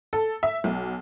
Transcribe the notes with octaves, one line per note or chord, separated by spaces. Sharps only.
A4
E5
B1